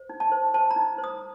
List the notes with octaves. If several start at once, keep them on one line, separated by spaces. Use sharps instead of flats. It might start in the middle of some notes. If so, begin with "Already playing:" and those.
Already playing: C5
D#4
A5
C5
C5 A5
A#5
D#4
C5
D#6